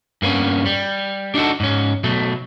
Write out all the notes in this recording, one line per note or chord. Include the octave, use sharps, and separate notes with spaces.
G2 A#3 B3 C#4
G3
D4 D#4 F#4 A4
G#2 C#4
B2 F#3 A3